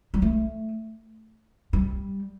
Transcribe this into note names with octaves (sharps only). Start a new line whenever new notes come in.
G3
A3
G3